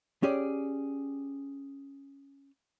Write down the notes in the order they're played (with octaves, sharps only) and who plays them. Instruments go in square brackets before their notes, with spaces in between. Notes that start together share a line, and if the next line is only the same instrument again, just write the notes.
[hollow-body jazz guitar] C#4 G4 G#4 D5